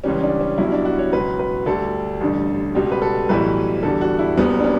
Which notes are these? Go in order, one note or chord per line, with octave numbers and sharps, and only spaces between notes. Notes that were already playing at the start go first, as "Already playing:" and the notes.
C#2 C#3 E3 G3 C#4
D4
C#4
B1 B2 G3 E4
D4
F#4
C#5
C#2 B2 F#3 B4
B4
D2 D3 G3 A4
A1 G2 D3
C#2 B2 G3 G4
B4
A4
B1 A2 E3 G3 B4
E2 D3 G3 A4
F#4
E4
F#1 F#2 C#3 G3 B3
D4
C#4